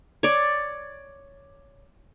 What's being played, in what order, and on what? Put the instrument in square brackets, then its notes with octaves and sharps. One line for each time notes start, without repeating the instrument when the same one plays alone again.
[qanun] C#5 D5